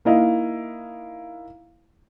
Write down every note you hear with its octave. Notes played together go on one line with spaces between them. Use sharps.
A#3 D#4 E4 D#5 F5